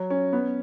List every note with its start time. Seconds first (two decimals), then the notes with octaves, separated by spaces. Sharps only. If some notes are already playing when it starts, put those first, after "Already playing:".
Already playing: F#3
0.10 C#4
0.33 B3